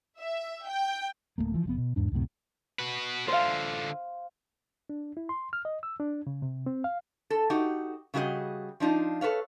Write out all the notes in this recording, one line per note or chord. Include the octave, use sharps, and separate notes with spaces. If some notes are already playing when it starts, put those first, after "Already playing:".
E5
G5
D1 C2 A3 A#3
E3 F3
F1 F2 B3
B2
E2 G#2 D4
C#2 F#2 A2 C3
F#4 B4
D3 F4 C5 F5
D4
E4
C6
F6
D#5
E6
D4
C#3
C3
C4
F5
A4
D#4 F#4 G4
C#3 G3 F#4 G#4 D#5
F3 D4 D#4 F4
A4 B4 C#5 F5